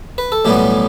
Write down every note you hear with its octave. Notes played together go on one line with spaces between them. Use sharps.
B4
A4
B1 A2 E3 G3 B3 G4